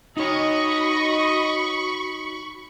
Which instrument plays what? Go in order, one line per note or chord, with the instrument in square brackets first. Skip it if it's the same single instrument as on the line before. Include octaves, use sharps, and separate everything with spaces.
[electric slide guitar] D#4 C#5 [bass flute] F#4 [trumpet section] D#5 [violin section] B5 C#6